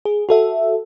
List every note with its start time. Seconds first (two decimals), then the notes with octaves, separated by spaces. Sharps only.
0.05 G#4
0.29 F#4 A4 E5